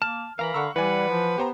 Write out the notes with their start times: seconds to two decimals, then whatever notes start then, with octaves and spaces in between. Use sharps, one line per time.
0.02 A#3 A5 F6
0.39 E3 A#4 F5 A#5 B5
0.54 D3 F#5 C#6 E6
0.76 E3 G3 B4 D5 F#5 G#5
1.08 F3
1.38 B3 G4 C5 A#5